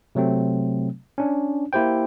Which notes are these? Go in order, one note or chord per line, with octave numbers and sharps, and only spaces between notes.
C3 F#3 A3 C4
C#4 D4
A#3 E4 G4 C5 G5